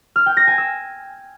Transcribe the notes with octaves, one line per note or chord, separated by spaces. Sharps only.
F6
G5
A#6
G#5
E6